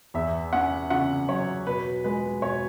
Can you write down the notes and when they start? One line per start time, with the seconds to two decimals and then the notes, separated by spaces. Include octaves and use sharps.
0.14 E2 E5
0.53 C#4 F#5
0.90 C#3 F#5
1.28 F#3 C#5
1.67 B2 B4
2.04 G#3 B4
2.42 B2 C#5